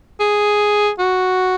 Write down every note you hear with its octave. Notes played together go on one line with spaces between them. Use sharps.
G#4
F#4